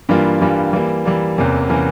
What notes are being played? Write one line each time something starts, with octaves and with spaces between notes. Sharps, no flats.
G2 E3 G3 A#3 F4
G2 E3 G3 A#3 F4
E3 G3 A#3
E3 G3 A#3
E2 C3 E3 A#3 C#4
C3 E3 A#3 C#4